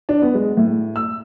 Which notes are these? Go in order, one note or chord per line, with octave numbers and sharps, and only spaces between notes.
D4
B3
G#3
A2
E6